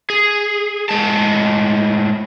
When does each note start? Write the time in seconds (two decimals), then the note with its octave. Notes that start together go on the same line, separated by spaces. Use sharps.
0.10 G#4
0.89 A2 G#3 A5